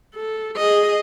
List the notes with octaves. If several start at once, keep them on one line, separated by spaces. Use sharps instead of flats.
A4
G#4 D#5